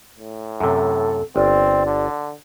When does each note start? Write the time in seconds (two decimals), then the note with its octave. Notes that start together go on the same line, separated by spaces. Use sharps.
0.19 A2
0.61 F#2 C3 A4
1.36 G1 C4 D5
1.86 D3